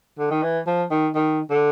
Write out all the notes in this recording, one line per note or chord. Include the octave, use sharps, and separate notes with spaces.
D3
D#3
E3
F3
D#3
D#3
D3